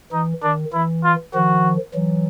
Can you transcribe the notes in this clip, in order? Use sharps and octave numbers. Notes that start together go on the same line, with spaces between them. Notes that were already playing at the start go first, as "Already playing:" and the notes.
E3 D#4
D#3 D4
E3 E4
F4
D#3 F3 F#4
E3 F#3